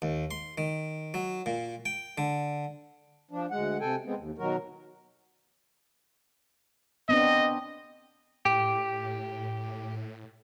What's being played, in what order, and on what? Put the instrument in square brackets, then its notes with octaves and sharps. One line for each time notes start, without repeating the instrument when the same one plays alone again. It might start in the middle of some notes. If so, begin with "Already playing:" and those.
[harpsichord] D#2
C6
D#3
F#3
A#2
G5
D3
[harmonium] F3 D4
D2 G#3 F#5
C3 A4 G5 G#5
G#3 B3 C4
D#2
B2 D#3 F#3 F#4 A#4
[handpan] B3 C4 D4 [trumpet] D#5
[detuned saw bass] A2 [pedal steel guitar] G4